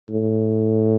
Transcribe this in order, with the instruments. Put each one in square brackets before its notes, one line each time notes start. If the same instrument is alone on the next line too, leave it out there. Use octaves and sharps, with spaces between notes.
[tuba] A2